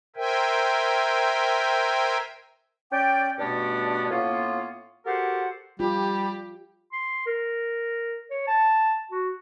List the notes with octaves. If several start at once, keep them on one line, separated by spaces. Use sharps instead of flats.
A#4 C5 E5 G5 G#5
C#4 D5 G5
G2 B2 A3 B3 C#4 D4
A2 A#3 B3 C#4 F4
F#4 G4 A4 A#4 C5 F#5
G3 F4 G4
C6
A#4
C#5
A5
F#4